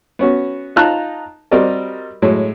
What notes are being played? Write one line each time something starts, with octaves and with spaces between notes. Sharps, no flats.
B3 C#4 F#4
D#4 F4 A5 A#5 F#6
G3 C4 F#4 A#4 D5 D#5
A2 F#3 G#3